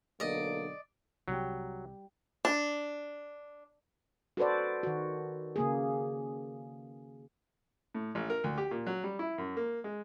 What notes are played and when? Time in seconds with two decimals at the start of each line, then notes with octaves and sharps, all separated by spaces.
0.20 B1 D3 A#3 D5 D#5
1.28 C2 C3 F#3 G3 G4
2.45 D4
4.37 F#4 A4 B4 C5 D5
4.83 D#3 F#4
5.56 C#3 A#3 G#4
7.95 A2
8.15 A1
8.30 A#4
8.44 D2
8.58 G4
8.71 A#2
8.86 F#3
9.04 G3
9.19 E4
9.38 F#2
9.57 A#3
9.84 G#3